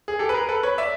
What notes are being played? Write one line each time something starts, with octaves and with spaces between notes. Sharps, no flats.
G#4
G4 A4
B4
G#4 A#4
A4 B4
B4 C#5
D5 E5